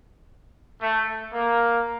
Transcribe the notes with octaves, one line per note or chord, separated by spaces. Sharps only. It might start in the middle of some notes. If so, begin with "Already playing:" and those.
A3
A#3